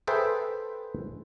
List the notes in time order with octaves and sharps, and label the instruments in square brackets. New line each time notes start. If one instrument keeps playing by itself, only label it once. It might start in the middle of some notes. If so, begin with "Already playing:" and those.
[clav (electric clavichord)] G#4 A4 B4 C5 E5 G5